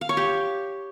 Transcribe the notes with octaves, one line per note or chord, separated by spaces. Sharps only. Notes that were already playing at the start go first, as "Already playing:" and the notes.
F5
C#5
G4